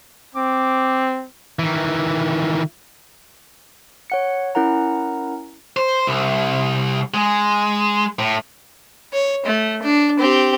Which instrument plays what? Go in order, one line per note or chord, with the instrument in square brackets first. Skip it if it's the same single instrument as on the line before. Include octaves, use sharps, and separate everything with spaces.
[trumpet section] C4 [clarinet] D6
[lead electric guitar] D#3 E3
[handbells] C#5 F#5 C#7
C#4 E4 A#4 F#5 A#5
[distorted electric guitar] C5
C2
G#3
A2
[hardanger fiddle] C#5
A3
D4
C4 G4